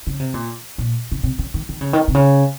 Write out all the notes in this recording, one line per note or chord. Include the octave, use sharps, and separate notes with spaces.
C#3
C3
A#2
A#2
C#3
C3
C#3
D#3
D#3
C#3
D#3
C3
C#3